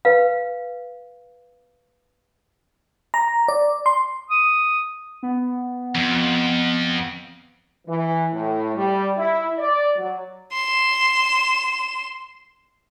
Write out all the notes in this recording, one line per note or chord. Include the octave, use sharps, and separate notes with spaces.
B4 F5
A#5
D5
C6
D#6
B3
F2
E3
A2
G3
E4
D5
F#3
C6 E7